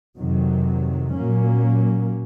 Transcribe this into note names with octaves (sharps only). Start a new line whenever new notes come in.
F2 C3 D#3 F#3
A#2 F#3 A#3 C#4